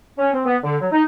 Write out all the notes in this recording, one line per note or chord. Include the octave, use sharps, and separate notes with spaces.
C#4
C4
B3
D3
F#3
D#4